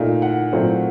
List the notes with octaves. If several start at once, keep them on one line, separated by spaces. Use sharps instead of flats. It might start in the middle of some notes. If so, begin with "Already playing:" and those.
Already playing: A#2 A3 D#4
F#5
A#2 F#3 A3 C4